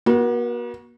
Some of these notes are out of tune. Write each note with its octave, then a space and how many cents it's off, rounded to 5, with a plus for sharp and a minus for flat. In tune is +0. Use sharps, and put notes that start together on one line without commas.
A#3 +45 F#4 +0